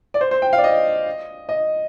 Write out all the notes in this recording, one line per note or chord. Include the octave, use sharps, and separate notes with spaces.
D5
C5
C5
G5
F5
D5
D#5
D#5